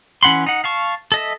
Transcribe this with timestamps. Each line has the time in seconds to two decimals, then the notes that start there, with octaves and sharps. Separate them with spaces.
0.23 E3 C#4 F#5 B5 C6
0.46 D#4 F#5
0.64 F5 A5 C#6
1.12 A4 D#5 E5